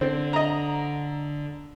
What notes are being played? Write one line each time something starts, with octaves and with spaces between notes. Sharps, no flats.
D3 C4
D#5 A#5